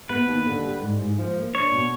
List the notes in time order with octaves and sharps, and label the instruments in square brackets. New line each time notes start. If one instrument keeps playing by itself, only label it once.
[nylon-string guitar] B3 [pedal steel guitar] B4
[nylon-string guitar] D#2
D3
G3
G#2
G#2
F3
A#3
[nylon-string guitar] D4 [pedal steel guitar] C#5
[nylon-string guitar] B2